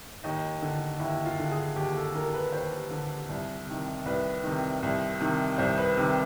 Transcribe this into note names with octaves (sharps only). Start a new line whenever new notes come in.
D#2 D#4
D3
D#2 E4
F4
D3
G#4
D#2 G4
A4
D3 A#4
B4
D#2 C5
D3
C2
C3 D#3
C2 B4
C3 D#3
C2
C3 D#3
C2 C5
B4
C3 D#3